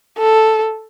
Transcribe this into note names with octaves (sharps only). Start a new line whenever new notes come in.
A4